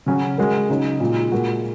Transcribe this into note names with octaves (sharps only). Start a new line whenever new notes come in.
C#3 F#3 C#4 F#4
G#3 F#4 A#4
C#3 F#3 D#4
A#2 G#3 D#4
A#2 G#3 F#4 A#4